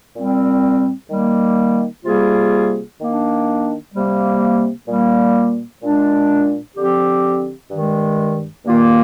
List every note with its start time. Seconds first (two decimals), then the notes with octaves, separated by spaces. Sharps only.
0.15 A#2 G3 C4
1.10 D#3 G3 A#3
2.04 C3 G3 A#3 F4 G#4
2.99 D#3 A#3 D4
3.93 C3 G3 A#3
4.87 A#2 G3 A#3
5.81 A#2 G#3 D4
6.76 D3 F3 C4 G4
7.71 G2 D#3 G#3
8.64 G2 D#3 A#3 F4